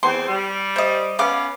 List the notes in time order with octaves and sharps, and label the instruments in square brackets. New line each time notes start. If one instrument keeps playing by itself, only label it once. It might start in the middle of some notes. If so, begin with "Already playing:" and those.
[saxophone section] E2 C4 C5 [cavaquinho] C6
[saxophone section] G3
[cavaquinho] C5 D#5
[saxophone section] B3 C#4 [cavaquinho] B4 F5 D6